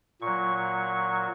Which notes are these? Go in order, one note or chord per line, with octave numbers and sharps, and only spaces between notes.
A#2 F#3 C#6